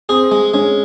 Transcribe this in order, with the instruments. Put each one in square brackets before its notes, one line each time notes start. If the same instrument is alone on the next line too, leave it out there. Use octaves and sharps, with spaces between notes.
[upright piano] C4 [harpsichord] G#4
[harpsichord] G#3
[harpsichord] G#3 [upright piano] C#4